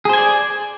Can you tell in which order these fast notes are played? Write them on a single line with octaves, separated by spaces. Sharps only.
G#4 C5 G#5 D5